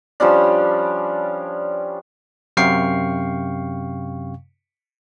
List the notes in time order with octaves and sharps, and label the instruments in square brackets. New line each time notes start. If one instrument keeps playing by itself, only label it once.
[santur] F3 G3 C#4 D4
[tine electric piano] F#2 C3 F5 G5 C#6 C7